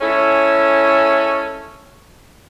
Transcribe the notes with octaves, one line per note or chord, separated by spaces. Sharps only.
G#3 C#4 E4 A4